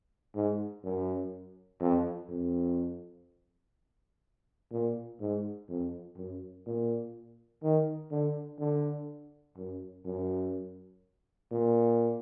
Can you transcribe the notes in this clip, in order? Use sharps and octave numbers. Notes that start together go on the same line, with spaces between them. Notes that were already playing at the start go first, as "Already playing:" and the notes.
G#2
F#2
F2
F2
A#2
G#2
F2
F#2
A#2
D#3
D3
D3
F#2
F#2
A#2